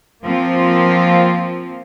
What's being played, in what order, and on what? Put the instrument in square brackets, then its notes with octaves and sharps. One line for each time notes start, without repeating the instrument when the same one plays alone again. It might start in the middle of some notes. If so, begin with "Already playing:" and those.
[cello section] F3 A#3 C4 F4